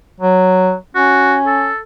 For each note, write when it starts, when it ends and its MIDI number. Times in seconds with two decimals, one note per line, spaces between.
0.20 0.74 54
0.95 1.69 61
0.95 1.36 66
1.47 1.79 69